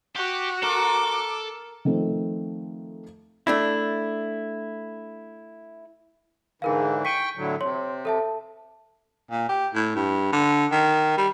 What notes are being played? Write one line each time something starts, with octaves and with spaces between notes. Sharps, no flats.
F#4 G4
A4 A#4 D6
D#3 F3 A3 C4
A3 D4 E4
G#2 D3 E3 G#4 A#4 F5
G5 C#6 B6 D#7
A2 D3 F#3
C3 C#5 C6
A4 E5 A5
A#2
G4
A2
G2
D3
D#3
G3